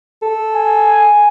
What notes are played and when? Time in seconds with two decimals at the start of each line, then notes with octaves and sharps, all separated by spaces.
0.22 A4
0.55 G#5